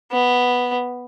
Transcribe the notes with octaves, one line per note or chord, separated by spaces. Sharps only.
B3